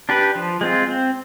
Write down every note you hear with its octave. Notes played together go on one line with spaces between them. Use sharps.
D4 G4 B4
F3
G#3 C4 F4
C4